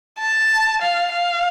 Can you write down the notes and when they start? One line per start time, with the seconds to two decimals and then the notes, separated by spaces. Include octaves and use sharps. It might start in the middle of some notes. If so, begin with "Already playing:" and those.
0.19 A5
0.82 F5
1.12 F5